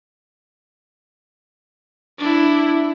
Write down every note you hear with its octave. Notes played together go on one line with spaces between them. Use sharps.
D4 E4